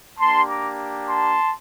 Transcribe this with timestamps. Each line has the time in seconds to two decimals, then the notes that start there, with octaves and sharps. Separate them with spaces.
0.18 A#3 D4 G4 A5 C6
0.48 A#5 D6
1.09 A5 C6